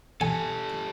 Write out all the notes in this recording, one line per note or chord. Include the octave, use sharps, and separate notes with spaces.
G3 A4 G#5